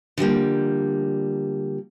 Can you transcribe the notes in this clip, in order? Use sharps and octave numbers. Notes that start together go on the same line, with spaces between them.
D3 F3 G3 A#3